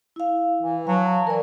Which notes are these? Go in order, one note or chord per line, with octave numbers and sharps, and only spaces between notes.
E4 F5
E3
F#3 F5 A5
E3 A#4 D5